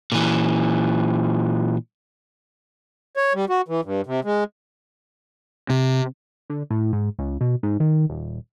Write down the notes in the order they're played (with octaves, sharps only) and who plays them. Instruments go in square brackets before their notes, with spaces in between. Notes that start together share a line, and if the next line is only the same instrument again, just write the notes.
[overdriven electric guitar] A#2 E3
[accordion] C#5
G3
F#4
E3
G2
C3
G#3
[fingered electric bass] C3
[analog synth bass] D3
A2
G#2
C#2
B2
G#2
D#3
D#1